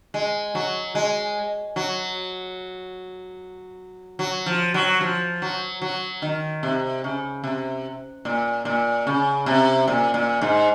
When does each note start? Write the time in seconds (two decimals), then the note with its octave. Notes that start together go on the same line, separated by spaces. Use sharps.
0.14 G#3
0.55 F#3
0.95 G#3
1.76 F#3
4.19 F#3
4.46 F3
4.74 F#3
5.01 F3
5.42 F#3
5.82 F#3
6.22 D#3
6.63 C3
7.04 C#3
7.44 C3
8.25 A#2
8.65 A#2
9.07 C#3
9.46 C3
9.88 A#2
10.14 A#2
10.41 G#2